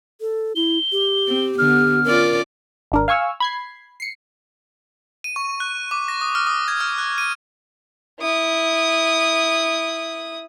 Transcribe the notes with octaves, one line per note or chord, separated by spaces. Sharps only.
A4
E4 G7
G4
C4
D3 B3 F6
C#4 F4 A#4 D5
G#1 D4 A#4
F5 G#5 C#6 E6 F6
B5 G#6 C7
C7 C#7
D#7
C#6
F#6
D6
A#6
D#6
F6
D#6
G#6
F6
F#6
D#7
E4 D#6